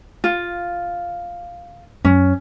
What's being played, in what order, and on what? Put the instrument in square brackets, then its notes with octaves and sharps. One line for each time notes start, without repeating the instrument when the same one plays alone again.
[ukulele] F4
[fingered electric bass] F#2 [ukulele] C#4